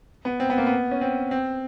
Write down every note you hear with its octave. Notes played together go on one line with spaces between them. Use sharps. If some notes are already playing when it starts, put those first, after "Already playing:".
B3
C4
B3
A#3
B3
C#4
C4
C4